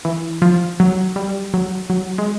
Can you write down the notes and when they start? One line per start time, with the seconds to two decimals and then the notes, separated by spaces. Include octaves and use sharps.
0.05 E3
0.42 F3
0.80 F#3
1.16 G3
1.54 F#3
1.90 F#3
2.18 G#3